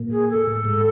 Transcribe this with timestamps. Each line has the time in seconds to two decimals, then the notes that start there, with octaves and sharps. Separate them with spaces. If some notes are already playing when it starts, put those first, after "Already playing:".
Already playing: A#2
0.11 G#4
0.29 A4
0.47 A2
0.65 G#2